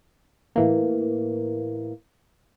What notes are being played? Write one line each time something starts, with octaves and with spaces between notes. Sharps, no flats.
A2 E3 A#3